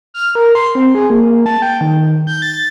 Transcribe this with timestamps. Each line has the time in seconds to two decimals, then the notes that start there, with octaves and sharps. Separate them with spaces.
0.14 F6
0.35 A#4
0.55 C6
0.75 C4
0.95 G#4
1.10 A#3
1.46 A5
1.62 G5
1.81 D#3
2.27 G6
2.42 A6